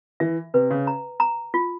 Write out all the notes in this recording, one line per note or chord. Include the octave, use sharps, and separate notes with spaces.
E3 E5
C3 B4
C#3
A#5
A#5
F4